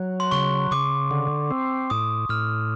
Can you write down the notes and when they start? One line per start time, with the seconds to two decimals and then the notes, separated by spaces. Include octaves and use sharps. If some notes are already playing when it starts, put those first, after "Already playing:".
Already playing: F#3
0.20 C6
0.31 C#3 C#6
0.71 C#3 D6
1.11 D3
1.51 C4
1.90 A2 D#6
2.29 A2 F6